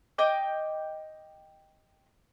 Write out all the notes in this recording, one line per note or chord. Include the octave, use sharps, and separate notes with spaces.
D#5 G5 D6